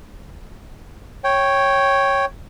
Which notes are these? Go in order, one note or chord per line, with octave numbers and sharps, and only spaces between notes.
C#5 G5